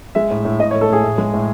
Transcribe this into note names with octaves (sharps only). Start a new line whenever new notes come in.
G#3 E5
A2
A2
A2 D#5
C#5
A3
A4
A2 G#4
A2
G#3
A2